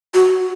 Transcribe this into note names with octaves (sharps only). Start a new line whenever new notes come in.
F#4